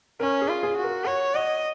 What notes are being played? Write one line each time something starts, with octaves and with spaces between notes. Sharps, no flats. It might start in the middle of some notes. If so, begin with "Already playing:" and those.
C#4 A#4
G#4
F4
G#4
F#4
A#4
C#5 F#5
D#5 F#5